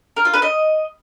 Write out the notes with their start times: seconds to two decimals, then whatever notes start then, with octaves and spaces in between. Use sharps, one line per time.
0.16 A#4
0.25 F4
0.34 B4
0.42 D#5